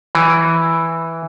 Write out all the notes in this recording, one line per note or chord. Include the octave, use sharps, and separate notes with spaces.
E3